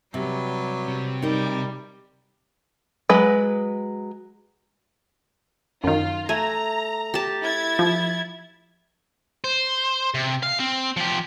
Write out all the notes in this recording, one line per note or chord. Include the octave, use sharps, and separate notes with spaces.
C3 F#3 G3 B4
C3
G3 D#4 A#4
F#3 G#3 B4
F#2 D#3 F4
A3 G#5 A#5
G4 A5
E4 G#6 A6
F3
C5
C3
F5
C4
F3 G4